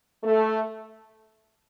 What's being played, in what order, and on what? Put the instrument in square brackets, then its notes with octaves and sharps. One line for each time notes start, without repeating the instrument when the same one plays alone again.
[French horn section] A3